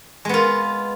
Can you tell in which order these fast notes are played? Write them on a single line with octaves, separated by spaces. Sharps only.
G#3 B3 F4